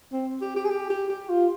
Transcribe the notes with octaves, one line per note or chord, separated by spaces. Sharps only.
C4
G4
G4
G#4
G4
G4
G4
F4